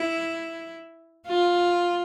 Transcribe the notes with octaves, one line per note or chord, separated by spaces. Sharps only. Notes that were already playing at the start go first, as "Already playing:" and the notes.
Already playing: E4
F4